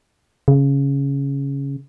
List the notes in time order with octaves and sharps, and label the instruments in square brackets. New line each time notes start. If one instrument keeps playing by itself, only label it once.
[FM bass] C#3